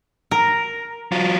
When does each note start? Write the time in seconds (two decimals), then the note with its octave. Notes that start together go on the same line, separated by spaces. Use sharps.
0.31 A#4
1.12 F#3 F4